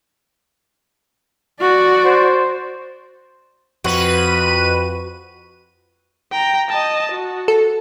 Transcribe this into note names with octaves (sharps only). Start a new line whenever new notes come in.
F#4 D5
C5
F2 F#4 B4 D#7
G5 A#5
D#5 A5
F#4
A4